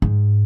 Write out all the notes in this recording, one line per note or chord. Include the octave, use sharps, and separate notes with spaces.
G#2